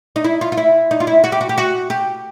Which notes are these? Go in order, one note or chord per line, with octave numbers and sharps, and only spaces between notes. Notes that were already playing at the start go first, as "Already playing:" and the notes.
D#4
E4
F4
F4
E4
D#4
F4
E4
F#4
G4
F#4
G4
F#4
G4